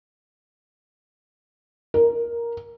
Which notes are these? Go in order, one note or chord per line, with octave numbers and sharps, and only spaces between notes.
A#4